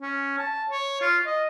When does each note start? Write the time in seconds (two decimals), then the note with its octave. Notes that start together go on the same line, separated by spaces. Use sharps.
0.01 C#4
0.39 A5
0.70 C#5
1.01 F4
1.26 D#5